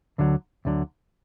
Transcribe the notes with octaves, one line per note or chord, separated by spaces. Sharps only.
D2 D3 F#3
D2 D3 F#3